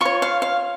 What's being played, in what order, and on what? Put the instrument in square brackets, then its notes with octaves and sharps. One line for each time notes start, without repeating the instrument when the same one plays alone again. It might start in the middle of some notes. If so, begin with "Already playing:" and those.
[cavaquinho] F4 C#5 C#6
F5
F5